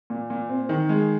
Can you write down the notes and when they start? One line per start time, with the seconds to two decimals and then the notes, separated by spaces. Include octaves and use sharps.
0.10 A#2
0.30 A#2
0.49 C4
0.69 D#3
0.89 G#3